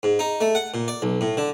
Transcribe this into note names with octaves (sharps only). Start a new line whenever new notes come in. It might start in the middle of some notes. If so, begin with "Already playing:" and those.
G#2
D#4
A3
F#5
A#2
D5
B1
A2
D3